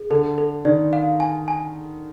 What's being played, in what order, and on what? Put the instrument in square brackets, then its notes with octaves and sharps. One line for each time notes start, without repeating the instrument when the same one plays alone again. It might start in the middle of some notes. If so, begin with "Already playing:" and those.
Already playing: [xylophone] G#4
[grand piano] D3 [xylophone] A4
[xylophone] A4
[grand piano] D#3 [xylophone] D5
[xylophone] F5
G#5
G#5